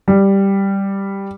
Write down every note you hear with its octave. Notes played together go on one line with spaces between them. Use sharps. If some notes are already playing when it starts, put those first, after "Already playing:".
G3